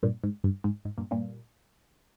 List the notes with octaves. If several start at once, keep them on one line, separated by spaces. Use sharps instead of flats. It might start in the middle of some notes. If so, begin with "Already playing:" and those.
G2 A#2
G#2
G2
G#2
G#2
G2 A#2
G2 A#2